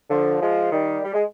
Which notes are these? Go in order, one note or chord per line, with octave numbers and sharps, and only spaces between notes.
D3 F3
F3 G#3
D#3 G3
G3
G#3